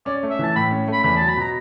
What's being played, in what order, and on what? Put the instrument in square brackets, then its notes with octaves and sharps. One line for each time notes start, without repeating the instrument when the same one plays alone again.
[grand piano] C#4 [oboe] D5
[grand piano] A3
[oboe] E5
[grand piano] E3 [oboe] A5
[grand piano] A2 [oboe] B5
[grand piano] C#4
[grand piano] A3 [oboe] B5
[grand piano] E2 [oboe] B5
[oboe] A5
[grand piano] F#3
[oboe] B5
[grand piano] B2 [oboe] A#5